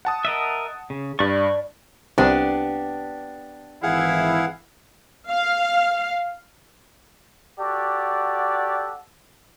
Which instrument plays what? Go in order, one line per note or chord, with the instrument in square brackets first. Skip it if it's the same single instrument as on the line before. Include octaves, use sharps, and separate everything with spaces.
[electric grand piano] F#5 A5 D#6
[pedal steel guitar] A#4 D#5 E5
C#3
[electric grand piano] G2 A6 [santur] D4 [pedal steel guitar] B5 C#6
[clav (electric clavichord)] C2 [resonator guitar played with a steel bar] B3 D4 G4
[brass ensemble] G#1 E3 E4 [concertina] G#4 F5 F#5
[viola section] F5
[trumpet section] F#4 G4 A4 D5 F#5